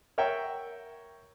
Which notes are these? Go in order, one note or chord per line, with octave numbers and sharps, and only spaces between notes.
A#4 C#5 E5 F#5 G5